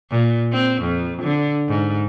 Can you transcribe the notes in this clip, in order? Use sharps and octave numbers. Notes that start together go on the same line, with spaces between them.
A#2
C4
F2
D3
G#2